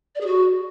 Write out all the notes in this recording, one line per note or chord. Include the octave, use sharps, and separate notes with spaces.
D5
G#4
F#4